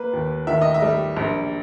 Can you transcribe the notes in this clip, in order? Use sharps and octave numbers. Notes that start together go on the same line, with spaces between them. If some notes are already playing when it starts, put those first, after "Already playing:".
Already playing: A#3 B4
D#2
D#3 E5
D#5
E5
G3
A#1